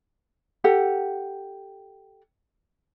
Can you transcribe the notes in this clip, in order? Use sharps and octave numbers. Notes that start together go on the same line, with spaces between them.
G4 A4 F#5